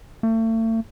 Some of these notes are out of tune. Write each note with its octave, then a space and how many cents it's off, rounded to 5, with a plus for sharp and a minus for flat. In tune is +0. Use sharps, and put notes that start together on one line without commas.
A3 +40